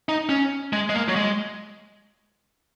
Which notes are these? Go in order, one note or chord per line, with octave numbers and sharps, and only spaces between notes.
D#4
C#4
G#3
G#3
A#3
F#3
G#3